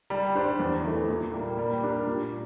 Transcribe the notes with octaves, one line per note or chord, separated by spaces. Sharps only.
G3
D4 G4 C5
E2
E3 A3
A#2
G3 A#3
G3
D4 G4 A#4
A#2